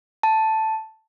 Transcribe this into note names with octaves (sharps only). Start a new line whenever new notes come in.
A5